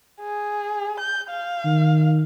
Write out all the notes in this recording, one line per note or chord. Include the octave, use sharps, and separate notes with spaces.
G#4
G6
F5
D#3